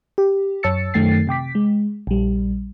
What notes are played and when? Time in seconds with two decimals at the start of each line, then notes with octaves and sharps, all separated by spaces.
0.18 G4
0.63 F#2 C#5 A5 E6 A6 C#7
0.94 F#2 D#3 A3 G5 A6 C7
1.27 C3 G5 D6 B6
1.55 G#3
2.07 A#1 G3